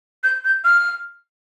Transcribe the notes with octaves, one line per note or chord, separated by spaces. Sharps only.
G6
G6
F6